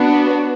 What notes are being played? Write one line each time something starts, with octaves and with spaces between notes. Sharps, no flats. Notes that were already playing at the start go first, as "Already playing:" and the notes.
Already playing: B3 D4 F#4